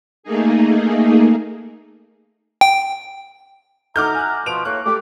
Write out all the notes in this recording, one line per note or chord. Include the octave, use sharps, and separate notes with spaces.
A3 A#3 D#4 G#4
G5
D#4 F#4 A4 E5 A#5 D6 F6 G6
G#5 F#6
B2 F3 D7 F7
A2 A#3 C#5 F#6
A3 G4 A4 D6